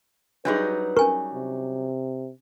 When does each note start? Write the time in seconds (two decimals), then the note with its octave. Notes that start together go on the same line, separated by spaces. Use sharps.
0.45 F#3 G3 D4 D#4 F#4 G#4 B4
0.97 C#4 A#4 G#5 C#6
1.34 C3